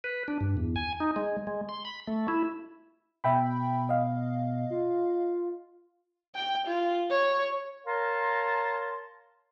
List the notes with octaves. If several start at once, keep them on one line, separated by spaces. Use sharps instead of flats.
B4
D4
G2
E2
G#5
D#4
G#3
G#3
C6
B5
A3
E4
B2 E5 G5 B5
D#5 F5
F4
G5
F4
C#5
A#4 C#5 F5 A5 A#5 C6